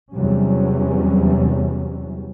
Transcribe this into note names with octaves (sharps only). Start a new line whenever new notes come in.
E2 C3 E3 F#3 G3 C#4